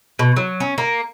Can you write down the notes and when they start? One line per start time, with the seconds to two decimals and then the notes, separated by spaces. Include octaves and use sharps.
0.19 B2
0.36 F#3
0.60 C#4
0.78 A#3